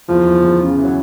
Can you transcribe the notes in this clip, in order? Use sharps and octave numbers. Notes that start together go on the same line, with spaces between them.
E2 F3
E2
E2
C#3
E3
F#3